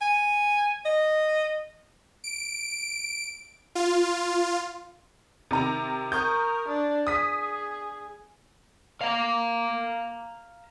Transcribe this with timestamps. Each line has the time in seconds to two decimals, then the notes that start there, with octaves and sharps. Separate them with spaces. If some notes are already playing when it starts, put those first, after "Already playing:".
0.01 G#5
0.86 D#5
2.24 D7
3.75 F4
5.51 C3 D#3 A#5
6.12 A#4 C#6 D#6 G6
6.68 D4
7.07 G#4 D#6 B6
9.01 F5 A#5